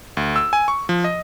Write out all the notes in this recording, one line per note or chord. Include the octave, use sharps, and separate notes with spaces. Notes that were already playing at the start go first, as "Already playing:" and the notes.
D2
E6
G#5
C#6
F3
D#5